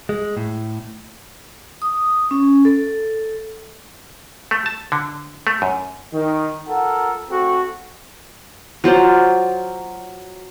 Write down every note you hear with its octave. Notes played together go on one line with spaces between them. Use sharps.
G#3
A2
D#6
C#4
A4
A3
A5
D3
A3
F#2
D#3
F4 A4 A#4 F#5
A3 C4 F#4 A4
F#3 F4 C5 D5